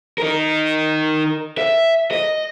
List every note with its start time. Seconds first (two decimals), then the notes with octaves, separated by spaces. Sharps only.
0.18 D#4 A#4
1.58 E5
2.11 D#5